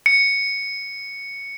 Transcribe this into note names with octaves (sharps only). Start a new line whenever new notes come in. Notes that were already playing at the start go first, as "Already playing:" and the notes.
C#7